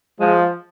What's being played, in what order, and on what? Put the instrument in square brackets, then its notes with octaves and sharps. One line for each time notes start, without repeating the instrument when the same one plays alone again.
[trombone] F3 [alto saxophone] G#3